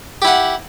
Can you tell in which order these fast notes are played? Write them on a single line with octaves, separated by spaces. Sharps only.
G4 E4 F#5